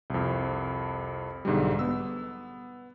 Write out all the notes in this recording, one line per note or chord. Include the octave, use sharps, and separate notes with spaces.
C2 F2
B1 G#2 D3 G3
B3 E6